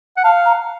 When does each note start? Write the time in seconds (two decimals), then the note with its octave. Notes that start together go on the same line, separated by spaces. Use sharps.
0.17 F#5
0.24 F5 A5
0.46 A#5